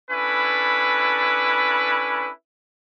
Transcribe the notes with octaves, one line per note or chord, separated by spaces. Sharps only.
C#4 D4 E4 A4 B4